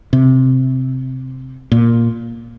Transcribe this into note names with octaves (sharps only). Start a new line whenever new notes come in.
C3
A#2